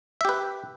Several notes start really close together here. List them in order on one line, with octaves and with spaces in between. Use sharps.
E5 G4 B4